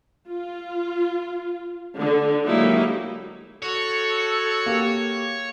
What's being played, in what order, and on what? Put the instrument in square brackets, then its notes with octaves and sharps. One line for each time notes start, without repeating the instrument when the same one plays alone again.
[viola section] F4
D3
F#3 G#3 A#3 D#4 E4 G4
[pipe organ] F#4 [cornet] A4 [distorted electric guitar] C#5
[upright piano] A#3 G4